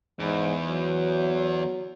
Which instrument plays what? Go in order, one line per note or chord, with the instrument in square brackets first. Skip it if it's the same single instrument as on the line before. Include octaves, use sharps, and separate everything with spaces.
[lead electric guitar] E2 [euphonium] G#2
[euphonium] F#3